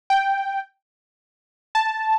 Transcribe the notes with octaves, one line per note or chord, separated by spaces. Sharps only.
G5
A5